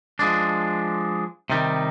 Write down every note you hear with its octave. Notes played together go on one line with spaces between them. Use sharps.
F3 G#3 D4
C3 D#3 G3